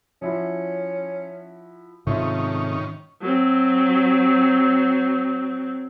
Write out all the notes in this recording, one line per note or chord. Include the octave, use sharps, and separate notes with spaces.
F3 C#4 E4 F#4
G#2 C3 D#3 A3 C#4 F4 E5
F#3 C4